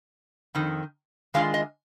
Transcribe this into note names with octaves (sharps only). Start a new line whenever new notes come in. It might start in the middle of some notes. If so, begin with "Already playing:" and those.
F2 D#3
D#3 G#3 D4 F4 F5
D#5